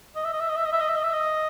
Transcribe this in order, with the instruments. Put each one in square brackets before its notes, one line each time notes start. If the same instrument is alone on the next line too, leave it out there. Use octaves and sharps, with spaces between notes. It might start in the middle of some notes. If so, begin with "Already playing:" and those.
[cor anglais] D#5
E5
D#5
E5
D#5
E5
D#5
E5
D#5
E5
D#5
E5
D#5